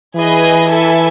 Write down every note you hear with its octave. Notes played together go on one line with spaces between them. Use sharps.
E3 G#4 B4 D#5 G#5
E4 A4 E5 G#5